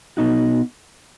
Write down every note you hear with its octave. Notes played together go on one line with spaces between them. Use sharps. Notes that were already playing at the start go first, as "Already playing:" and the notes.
B2 B3 D#4 F#4